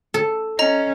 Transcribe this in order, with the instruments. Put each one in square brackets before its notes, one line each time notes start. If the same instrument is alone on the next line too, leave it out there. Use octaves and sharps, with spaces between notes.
[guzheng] A4
[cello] C#4 [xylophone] D#5 A#5